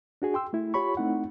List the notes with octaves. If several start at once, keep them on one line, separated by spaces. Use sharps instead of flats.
D4 F#4 G#4
G5 C6 E6
A3 E4
F4 G4 C#5 B5 C#6
A3 C4 D#4 E4 F#5